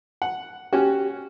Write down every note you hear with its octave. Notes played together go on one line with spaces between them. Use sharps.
F#5
C#4 F#4 G4